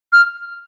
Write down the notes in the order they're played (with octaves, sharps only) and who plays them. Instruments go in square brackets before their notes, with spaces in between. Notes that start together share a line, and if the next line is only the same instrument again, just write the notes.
[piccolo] F6